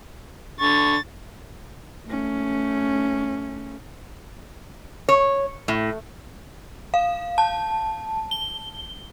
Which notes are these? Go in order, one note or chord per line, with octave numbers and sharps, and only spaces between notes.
D3 C#6 A6
A3 C#4
C#5
A2
F5
A5
G7